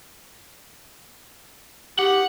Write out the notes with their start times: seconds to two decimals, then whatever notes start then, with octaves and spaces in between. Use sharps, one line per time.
1.99 G4 F#5